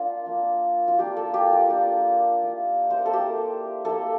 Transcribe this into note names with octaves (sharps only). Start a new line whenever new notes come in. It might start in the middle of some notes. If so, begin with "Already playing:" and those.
Already playing: A#3 D4 F4
A#3 D4 F4
F4
A#3 D4 F4 G4
A4
G4
F4
A#3 D4 F4
A#3 E4
C5
A#4
A4
A#3 E4 G4
A#3 E4 A4